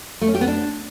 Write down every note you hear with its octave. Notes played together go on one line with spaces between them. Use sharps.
A3
C#4
G4
B3
D4